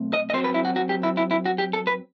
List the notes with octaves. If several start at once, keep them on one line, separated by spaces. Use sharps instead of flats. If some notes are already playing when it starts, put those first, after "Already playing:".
Already playing: B1 A3 C4
D#5
D#5
F#2 F#3 C4 C5
B4
E4
F#4
F#4
G4
E4
E4
E4
F#4
G4
A4
B4